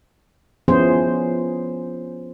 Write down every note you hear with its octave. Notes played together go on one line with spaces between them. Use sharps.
F3 B3 C#4 E4 G#4 C5